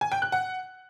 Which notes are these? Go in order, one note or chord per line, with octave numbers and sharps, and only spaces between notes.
G#5
G5
F#6
F#5